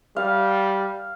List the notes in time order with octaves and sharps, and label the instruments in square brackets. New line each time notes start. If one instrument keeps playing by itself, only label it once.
[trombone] G3 [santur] F5